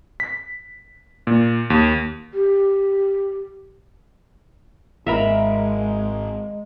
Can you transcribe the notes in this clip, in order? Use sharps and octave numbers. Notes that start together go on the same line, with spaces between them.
B6
A#2
D#2
G4
G#1 G#3 A#4 E5 F5 A#5 B5